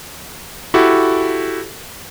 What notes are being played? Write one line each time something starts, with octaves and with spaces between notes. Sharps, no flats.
E4 F#4 G4 A4